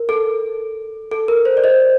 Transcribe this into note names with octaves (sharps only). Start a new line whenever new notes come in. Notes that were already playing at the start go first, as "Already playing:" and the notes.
Already playing: A#4
A4
A4
A#4
C5
D5
C5 D#5